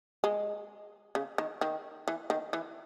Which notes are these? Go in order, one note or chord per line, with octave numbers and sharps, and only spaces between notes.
G#3
C#3
D#3
D#3
E3
D#3
E3